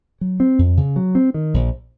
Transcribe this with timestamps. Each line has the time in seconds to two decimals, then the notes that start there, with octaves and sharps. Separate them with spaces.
0.21 F#3
0.40 C4
0.59 F2
0.77 C#3
0.96 F#3
1.15 C4
1.34 D#3
1.54 A#1